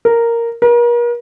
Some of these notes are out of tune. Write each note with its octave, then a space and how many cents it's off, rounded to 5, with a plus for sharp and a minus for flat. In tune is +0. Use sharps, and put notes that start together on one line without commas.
A#4 -5
A#4 +40